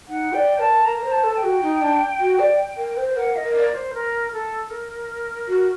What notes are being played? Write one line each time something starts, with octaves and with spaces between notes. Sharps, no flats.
D#4 F#5
D5 G5
A#4 A5
A#4 A#5
A#4
C5
A5
A4
G5
F#4
D#4
D4
F#4
D5
A#4
C5
A#4 F#5
D#5
A#4
D5
C5
A#4
A4
A#4
F#4